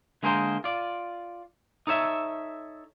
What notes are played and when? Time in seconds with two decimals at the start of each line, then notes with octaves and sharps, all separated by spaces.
0.23 D3 G#3 A#3 G#4 A#4 C5
0.64 F4 D5
1.87 D#4 A4 C#5 E5